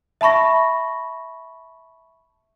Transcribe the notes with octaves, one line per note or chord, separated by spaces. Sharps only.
E5 A5 B5 C#6 A#6